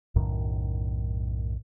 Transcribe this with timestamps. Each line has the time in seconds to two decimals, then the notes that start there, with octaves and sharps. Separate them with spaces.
0.16 B1 F#2 A2 D#3